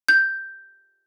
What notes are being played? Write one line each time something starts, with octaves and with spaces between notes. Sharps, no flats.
G6